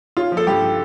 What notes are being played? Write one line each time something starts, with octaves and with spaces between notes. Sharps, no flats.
C#4 F4
F3
A4
G2 G4